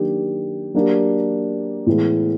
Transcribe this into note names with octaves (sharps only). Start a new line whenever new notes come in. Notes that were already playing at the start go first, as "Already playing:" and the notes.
Already playing: D#3 F#3 A#3 D4 G4
F#3 A#3 D4 G4
A2 E3 G#3 B3